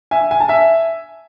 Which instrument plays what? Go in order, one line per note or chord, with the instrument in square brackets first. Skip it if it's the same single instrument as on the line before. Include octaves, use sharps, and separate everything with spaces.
[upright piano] E5 G#5
G#5
A5
E5 G#5